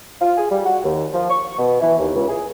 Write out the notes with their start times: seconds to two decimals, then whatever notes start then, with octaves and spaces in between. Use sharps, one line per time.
0.21 F4
0.38 G#4
0.50 G3
0.66 F#4
0.84 D#2
1.13 F3
1.30 C#6
1.59 B2
1.81 E3
1.99 D#2
2.14 C#2
2.29 G#4